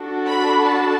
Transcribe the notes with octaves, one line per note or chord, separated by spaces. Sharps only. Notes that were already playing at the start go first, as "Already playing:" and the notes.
Already playing: D4 F#4 A4
B5
A5